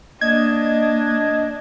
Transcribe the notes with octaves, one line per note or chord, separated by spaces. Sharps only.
A#3 D4 D#5 G#6